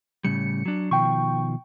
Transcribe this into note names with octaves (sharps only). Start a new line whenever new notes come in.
A2 C#3 G3 C#7
F#3 D4
B2 D#3 F3 G5 C#6